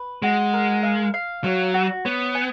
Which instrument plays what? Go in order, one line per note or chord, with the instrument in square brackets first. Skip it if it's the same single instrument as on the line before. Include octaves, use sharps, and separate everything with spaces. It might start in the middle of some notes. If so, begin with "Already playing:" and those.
Already playing: [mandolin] B4
[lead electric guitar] G#3 [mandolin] F#4
[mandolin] A#4
F5
F5
[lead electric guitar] F#3 [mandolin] C#5
[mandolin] F#4
[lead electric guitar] B3 [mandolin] C#5
[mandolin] G#5